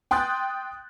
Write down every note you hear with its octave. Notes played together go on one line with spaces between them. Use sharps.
G5 C6 D#6 F#6 G6 A6